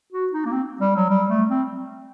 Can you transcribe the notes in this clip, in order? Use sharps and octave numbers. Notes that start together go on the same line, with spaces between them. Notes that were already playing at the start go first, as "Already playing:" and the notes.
F#4
D#4
A#3
C4
G3
F#3
G3
A3
C4